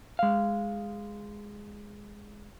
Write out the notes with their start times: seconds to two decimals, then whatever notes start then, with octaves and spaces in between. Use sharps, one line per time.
0.19 G#3 F5